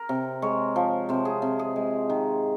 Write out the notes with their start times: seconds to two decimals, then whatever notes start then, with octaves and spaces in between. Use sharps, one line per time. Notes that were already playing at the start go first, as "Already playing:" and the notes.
Already playing: A#4
0.09 C3
0.42 G#3 C#5
0.76 F3
1.09 C3 C5
1.25 G#4
1.42 C3
1.59 G#4
1.76 G#3
2.10 D#3